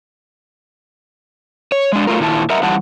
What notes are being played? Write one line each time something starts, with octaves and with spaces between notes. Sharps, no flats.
C#5
G#3 D4
F#3 A3 F4 A#4
A#2 D#3 E4 A4 A5
A#4 D#5 E5 F#5 A#5
F2 E3 G3 F#5 A5